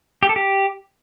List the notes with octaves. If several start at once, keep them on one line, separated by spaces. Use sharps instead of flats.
G4
A4
G4